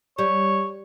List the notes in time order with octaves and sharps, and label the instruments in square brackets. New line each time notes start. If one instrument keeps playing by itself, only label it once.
[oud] G3 [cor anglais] C#5